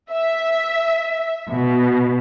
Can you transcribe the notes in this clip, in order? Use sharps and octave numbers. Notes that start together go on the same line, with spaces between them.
E5
B2